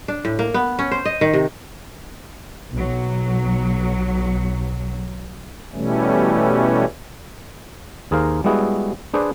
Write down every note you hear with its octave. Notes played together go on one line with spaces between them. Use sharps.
D4
A2
A#3
B3
C#4
C5
D#5
D#3
C3
B1 F#3
B2 E3 G3 A3 C#4
D#2 G#4 A#4 C5 F5 A#5
G3 G#3 B3 E4 F#4 G#4
D4 G#4 B4 C5 D5